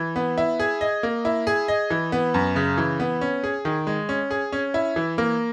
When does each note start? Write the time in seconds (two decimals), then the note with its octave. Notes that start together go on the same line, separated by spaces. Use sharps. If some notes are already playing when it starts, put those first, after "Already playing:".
Already playing: E3
0.16 B3
0.38 E4
0.60 G#4
0.81 D#5
1.03 A#3
1.25 E4
1.47 G#4
1.68 D#5
1.90 E3
2.12 B3
2.34 F#2
2.56 C#3
2.78 E3
3.00 B3
3.21 C#4
3.44 G#4
3.65 D#3
3.87 G#3
4.09 C#4
4.31 G#4
4.52 C#4
4.74 E4
4.96 E3
5.18 A#3